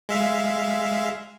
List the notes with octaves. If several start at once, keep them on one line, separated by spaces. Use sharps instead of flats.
G#3 E5 F5